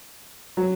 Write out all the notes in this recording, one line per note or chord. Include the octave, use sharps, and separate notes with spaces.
F#3